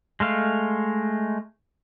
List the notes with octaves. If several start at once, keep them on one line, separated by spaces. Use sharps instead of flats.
G#3 A3 F5